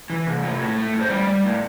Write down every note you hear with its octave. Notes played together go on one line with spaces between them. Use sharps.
E3
C3
A3
A2
A3
A2
C5
G3 D5
G3
A2